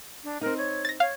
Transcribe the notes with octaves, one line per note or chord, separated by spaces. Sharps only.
D4
C4 D#4 A#4
C#5
A6 A#6
C#5 F5